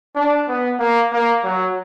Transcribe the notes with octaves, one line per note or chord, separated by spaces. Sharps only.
D4
B3
A#3
A#3
F#3